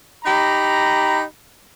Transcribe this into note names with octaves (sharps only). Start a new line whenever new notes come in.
D#4 G4 A#5 B5